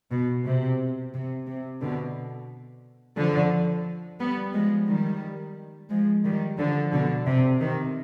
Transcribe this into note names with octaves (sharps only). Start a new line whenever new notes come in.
B2
C3
C3
C3
B2 D3
D3 F3
G3 B3
F3 G#3
D#3 G3
F3 G#3
D#3 G3
D3 F3
B2 D3
C3
C3 D#3